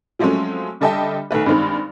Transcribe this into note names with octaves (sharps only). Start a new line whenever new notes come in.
F3 F#3 G#3 A3 C4 C#4
D3 G3 A4 D#5 E5 G5
B1 D#3 A3 B4
G2 D#3 G#3 C4 D#4